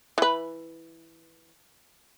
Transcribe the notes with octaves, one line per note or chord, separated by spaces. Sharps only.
E3 B4